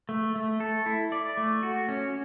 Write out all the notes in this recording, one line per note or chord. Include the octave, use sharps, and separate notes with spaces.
A3
A3
A4
E4
D5
A3
F#4
C#4